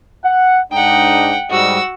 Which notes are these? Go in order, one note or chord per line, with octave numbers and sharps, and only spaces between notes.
F#5
G#2 D4 D#4 F#5 G5
G#2 G3 F#4 D#5 E6